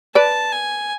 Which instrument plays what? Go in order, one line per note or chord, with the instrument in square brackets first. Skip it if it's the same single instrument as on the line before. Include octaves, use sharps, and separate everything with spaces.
[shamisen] B4 D5 [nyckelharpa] A5
[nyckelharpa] G#5